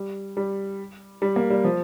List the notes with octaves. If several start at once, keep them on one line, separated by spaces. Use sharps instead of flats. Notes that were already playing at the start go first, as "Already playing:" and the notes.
Already playing: G3
G3
G3
A#3
G3
F3